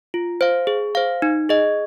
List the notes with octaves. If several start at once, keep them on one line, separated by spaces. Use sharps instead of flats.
F4
C5 F5
G#4
C5 F5
D#4
G#4 D#5